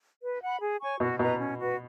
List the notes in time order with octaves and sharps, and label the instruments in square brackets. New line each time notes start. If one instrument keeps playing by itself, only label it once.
[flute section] B4
F#5 B5
G#4
C#5 G#5 C#6
[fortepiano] B2 [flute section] F#4
[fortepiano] B2 [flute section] B4 D#5 A#5
[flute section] C#4
F#4 B4